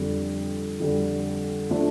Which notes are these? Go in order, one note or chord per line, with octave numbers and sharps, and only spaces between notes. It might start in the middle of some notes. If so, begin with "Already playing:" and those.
Already playing: F2 D3 G3
F2 D3 G3
F3 A3 D4